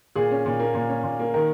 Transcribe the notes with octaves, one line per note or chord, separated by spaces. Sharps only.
A#2 G#4
C#4
A#2
A#3
A#2
C#4
A#2
A#3
D#3 A#4